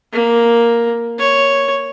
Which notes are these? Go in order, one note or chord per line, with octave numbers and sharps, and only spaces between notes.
A#3
C#5